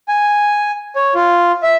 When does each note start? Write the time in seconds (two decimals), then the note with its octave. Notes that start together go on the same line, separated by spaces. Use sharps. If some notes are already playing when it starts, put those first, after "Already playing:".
0.08 G#5
0.96 C#5
1.15 F4
1.63 E5